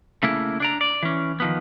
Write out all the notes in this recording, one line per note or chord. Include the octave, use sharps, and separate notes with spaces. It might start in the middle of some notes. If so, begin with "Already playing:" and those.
C#3 A3 A#3 E4
D4 D5 A#5
D5
E3 C#4
D#3 F3 B3